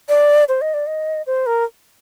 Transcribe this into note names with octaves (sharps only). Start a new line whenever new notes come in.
D5
C5
D#5
D5
D#5
C5
A#4